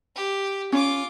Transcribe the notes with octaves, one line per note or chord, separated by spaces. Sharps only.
G4
C#4 F4 D6